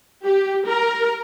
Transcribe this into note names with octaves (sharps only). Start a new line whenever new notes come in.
G4
A#4